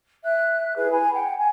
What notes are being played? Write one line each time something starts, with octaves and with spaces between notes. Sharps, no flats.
E5 F#6
E4 G#4 B4
G#5 B5
F#5 G5
G#5